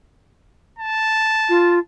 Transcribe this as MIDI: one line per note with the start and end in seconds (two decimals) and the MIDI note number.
0.79 1.81 81
1.49 1.78 65